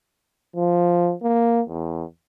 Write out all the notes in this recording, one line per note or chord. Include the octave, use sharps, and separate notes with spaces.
F3
A#3
E2